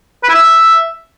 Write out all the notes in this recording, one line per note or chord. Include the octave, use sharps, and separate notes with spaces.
B4
E4
E5